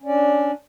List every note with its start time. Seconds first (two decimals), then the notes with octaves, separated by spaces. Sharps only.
0.02 C#4
0.06 D5
0.09 D4